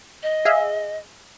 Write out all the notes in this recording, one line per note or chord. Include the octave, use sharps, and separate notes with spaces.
D#5
G#4 E5 F5